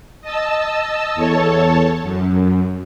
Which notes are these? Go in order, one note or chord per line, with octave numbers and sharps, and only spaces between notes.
D#5 A5 E6
E2 A4 C#5 A5
F#2